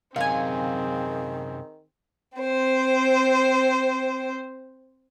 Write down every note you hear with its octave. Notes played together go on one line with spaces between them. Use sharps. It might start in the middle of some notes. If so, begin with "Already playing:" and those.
F#2 C3 D#3 C4 G#4 F5 G#5
C4 C5